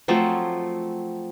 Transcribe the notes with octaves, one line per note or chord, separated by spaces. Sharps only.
F3 F#3 A3 C4